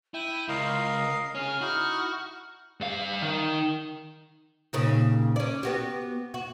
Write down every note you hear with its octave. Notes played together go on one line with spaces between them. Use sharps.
E4 G5 D#7
C#2 A#4 D#5 F5 C7
C#4 G#4 F6
D#4 E4 F#4
G2 F5
D#3
D#2 A#2 C#3
C#4 D5
B3 F#4 G4
F#4